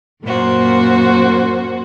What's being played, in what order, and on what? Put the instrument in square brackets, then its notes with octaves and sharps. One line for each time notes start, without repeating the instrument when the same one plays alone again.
[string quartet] F#2 A#2 A#3 F#4 C5